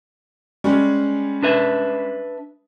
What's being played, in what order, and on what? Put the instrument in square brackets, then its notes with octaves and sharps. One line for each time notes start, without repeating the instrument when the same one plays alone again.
[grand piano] G3 G#3 C#4
[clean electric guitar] D4 B4 E5